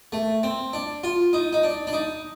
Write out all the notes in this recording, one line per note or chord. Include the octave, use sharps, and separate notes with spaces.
A3
C4
D4
F4
D#4
D#4
D4
D4
D#4